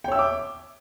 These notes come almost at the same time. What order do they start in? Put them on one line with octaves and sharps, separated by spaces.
G5 C#5 E6 E5 D6